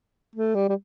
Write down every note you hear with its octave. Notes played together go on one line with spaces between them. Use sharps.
A3
G3
G3